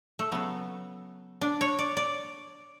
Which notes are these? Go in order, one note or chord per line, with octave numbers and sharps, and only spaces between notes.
A3
C#3 F#3 A3 B3
D4
C#5
D5
D5